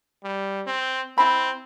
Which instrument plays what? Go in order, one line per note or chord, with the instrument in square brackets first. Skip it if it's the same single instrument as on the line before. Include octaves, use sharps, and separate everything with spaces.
[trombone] G3
C4
[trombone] C4 [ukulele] E4 B5